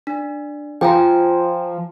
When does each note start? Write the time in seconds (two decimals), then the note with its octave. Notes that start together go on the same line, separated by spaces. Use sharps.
0.07 D4
0.81 F3 G5 G#5 A#5